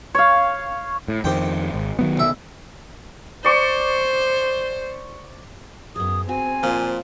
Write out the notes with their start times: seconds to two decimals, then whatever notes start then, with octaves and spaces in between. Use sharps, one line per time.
0.15 C#5 F5
1.08 A2
1.24 F2 D#3 G4 C5 G5
1.74 G#1
1.99 D#3 F#3 B3
2.17 B1 E5
3.45 C5 D5 C#6
5.96 F#2 B3 G#4 D#6
6.29 C4 F#4 G#5
6.63 A#2 F3 D5 D6